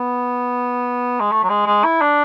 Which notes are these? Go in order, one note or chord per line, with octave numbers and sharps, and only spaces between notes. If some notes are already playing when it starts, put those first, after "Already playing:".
Already playing: B3
G#3
A3
F#3
G#3
G#3
E4
D4